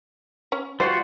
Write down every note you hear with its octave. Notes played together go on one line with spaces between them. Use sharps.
C#4
G3 F4 F#4 C5